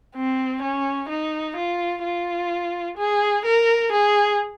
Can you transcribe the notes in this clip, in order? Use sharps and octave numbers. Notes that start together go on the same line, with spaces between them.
C4
C#4
D#4
F4
F4
G#4
A#4
G#4